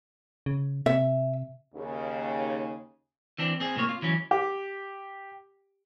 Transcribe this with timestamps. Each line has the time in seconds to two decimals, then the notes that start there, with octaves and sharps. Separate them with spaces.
0.46 C#3
0.86 C3 E5
1.74 D#2 C#3
3.38 E3 C4 D4
3.60 C4 G#4
3.76 A2 C3 A#3 C#5
3.89 F4
4.02 E3 F#3 C#4
4.31 G4